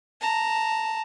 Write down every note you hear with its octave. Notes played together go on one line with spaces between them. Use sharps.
A5 A#5